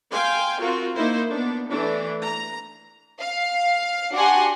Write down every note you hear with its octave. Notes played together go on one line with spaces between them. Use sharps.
F5 G5 G#5 C6
C4 F4 F#4 A#4
A#3 D#4 E4 A#4 C5
B3 D4
E3 A3 D4
A#5
F5
D4 F#4 G4 F#5 G#5 C6